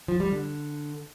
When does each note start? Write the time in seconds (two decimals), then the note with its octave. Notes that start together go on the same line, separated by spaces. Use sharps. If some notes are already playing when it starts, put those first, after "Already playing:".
0.08 F3
0.20 G3
0.32 D3